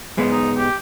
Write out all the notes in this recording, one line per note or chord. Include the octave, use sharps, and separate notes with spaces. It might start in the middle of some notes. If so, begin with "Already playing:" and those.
G#2 G#3 B3
D#4
G4